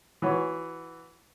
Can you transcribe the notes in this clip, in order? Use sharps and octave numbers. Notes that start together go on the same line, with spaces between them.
E3 F#4 C#5